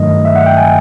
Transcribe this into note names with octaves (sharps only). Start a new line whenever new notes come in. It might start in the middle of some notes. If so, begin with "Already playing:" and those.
Already playing: G2 D#3 F#3 A3 D#5
E5
F#5
G5
G#5